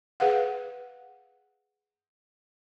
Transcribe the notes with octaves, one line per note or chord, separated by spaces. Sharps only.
G#4 B4 F5 F#5